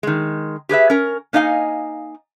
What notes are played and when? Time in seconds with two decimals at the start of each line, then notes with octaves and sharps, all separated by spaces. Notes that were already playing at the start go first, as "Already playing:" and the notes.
0.03 D#3 G#3
0.69 G4 G#4 B4 E5
0.90 C#4 A#4
1.33 A#3 D#4 D#5 F5 G#5